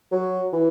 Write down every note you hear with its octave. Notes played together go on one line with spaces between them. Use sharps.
F#3
E3